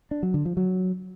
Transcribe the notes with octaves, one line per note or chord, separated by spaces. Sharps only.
D4
F#3
D3
F3
F#3